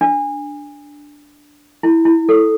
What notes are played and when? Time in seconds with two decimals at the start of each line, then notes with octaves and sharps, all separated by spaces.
0.01 D4
1.83 E4
2.05 E4
2.29 A4